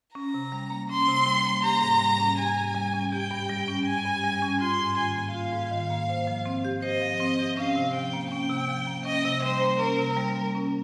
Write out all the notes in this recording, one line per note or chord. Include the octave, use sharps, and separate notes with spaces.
C#4 A#5
C3
G3
A#3
C#4 C6
C3
G3
A#3
G4 A#5
G#2
G3
C#4
G4 G#5
G#2
G3
C#4
G4 G5
G2
G3
C#4
G4 G#5
G2
G3
C#4
F4 C6
G#2
D#3 G#5
A#3
F4 F5
G#2
D#3
A#3
C5
F3
C4
G4
C5 D#5
F3
C4
G4
C#4 F5
C3
F3 G5
A#3
C#4 G5
C3
F3
A#3
C#4 D#5
C3
G3 C5
A#3
C#4 A#4
C3
G3
A#3
C#4